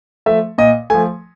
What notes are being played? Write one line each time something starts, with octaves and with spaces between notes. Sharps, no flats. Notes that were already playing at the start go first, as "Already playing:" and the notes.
F3 A3 E5
A#2 D#5
F3 A3 G#5